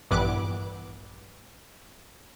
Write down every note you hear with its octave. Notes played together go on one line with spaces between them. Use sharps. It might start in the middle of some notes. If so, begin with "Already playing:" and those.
A#1 G2 E3 B3 D6 F#6